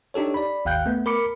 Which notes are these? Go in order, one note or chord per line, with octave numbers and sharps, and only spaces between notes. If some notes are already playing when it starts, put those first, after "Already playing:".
D4 D#4 G4 A4 C#5
D5 B5
G#1 D#2 F5 G5 F#6 G6
A3 B3
A#4 B5 D6 C#7